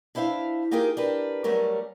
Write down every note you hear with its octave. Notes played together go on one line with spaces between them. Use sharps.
D4 E4 C5 E5 F5
A#3 D#4 F4 G4 G#4 A#4
D4 G4 A#4 B4
F#3 G3 A3 C#4 A#4